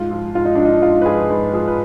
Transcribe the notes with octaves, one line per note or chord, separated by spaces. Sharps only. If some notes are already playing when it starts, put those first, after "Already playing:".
Already playing: G#2 F4
F3
G#2 F4
D#4
F3 D4
D#4
G#2 F4
B4
F3 G#4
G#2 B4
F3 G#4
B4